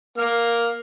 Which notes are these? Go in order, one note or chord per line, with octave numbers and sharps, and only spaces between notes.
A#3 F6